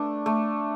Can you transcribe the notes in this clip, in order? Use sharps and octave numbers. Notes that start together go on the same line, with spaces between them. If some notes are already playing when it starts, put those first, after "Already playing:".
Already playing: A3 D4
A3